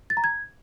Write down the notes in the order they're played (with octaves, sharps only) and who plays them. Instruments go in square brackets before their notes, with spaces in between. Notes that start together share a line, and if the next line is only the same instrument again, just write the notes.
[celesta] A6
A#5
G#6